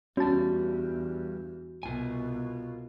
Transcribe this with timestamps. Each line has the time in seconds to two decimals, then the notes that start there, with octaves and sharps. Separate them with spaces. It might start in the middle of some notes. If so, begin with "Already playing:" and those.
0.17 E2 G2 G3 C#4 F#4 A5
1.83 C2 B2 F4 G#5